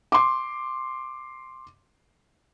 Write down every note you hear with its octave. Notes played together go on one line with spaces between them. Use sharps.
C6 D6